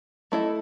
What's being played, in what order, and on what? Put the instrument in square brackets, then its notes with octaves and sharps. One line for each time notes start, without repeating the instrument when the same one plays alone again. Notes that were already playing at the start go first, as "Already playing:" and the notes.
[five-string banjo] A3 E4 A4 D#5